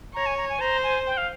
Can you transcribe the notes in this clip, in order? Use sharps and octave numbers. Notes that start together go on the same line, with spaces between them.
C#5 A#5
G#5
A#5
G#5
C5 A#5
G#5
G5
F5